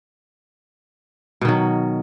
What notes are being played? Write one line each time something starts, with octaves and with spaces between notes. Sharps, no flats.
B2 D#3 F#3